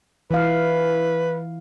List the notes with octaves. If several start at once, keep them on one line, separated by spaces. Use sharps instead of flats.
E3 B4 F5